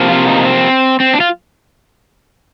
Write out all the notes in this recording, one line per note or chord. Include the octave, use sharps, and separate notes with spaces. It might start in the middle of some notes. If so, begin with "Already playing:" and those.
Already playing: C3 F3 A#3
F4
D#4
C4
C4
D4
F4